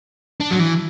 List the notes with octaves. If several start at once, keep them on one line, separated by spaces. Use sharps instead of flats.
D4
F#3
E3